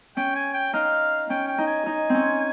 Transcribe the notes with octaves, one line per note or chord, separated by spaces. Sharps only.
C#4 G5
G#5
G5
D#4 F5
C#4 G5
G5
D#4
G#5
D#4
C4 C#4